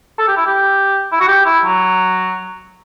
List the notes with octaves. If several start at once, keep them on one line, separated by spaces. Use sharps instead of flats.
A4
G4
E4
G4
E4
F#4
G4
E4
F#3